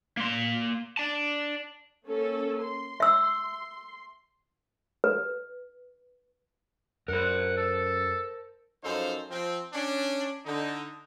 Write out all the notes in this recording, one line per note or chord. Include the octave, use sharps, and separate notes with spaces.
A#3 C6
D5 A5
A#3 C#4 A4
C6
E5 E6
B4
F#2 A#4 C5 F#5
A4
F#2 F3 D#4 A4 C5 F5
F3 C4
C#4 D4
D3 D#4